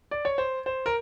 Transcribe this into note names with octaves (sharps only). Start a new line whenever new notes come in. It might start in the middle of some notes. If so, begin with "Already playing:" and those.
D5
C#5
C5
C5
A#4